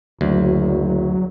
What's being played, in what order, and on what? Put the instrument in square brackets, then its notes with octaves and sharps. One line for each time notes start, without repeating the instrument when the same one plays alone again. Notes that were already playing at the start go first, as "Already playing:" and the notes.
[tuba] F#1 [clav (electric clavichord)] D2 [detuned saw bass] F#3